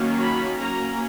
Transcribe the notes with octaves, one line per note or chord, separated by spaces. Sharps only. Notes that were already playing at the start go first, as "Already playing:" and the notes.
Already playing: D#3 F#3 A#3 C#4
B5
F#3 A#3 C#4 A#5